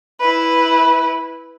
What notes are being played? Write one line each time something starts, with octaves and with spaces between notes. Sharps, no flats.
E4 B4